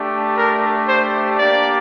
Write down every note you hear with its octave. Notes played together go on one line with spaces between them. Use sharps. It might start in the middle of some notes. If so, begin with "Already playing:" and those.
Already playing: A3 D4 G4
A#4
C5
A#3 D4 G4 D5